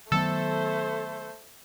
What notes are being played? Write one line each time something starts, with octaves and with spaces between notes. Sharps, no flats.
D#3 F#3 A3 B3 A4 C5